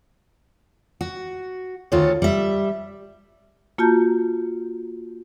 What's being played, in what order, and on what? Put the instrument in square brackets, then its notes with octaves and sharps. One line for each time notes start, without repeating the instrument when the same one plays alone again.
[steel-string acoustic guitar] F#4
D2 D#3 F4 A4 C#5
G3 E5
[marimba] A#3 F4 F#4 A5 A#5 G6